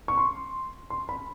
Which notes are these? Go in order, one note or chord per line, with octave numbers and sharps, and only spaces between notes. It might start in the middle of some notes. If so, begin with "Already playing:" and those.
C#6
C6
C6
B5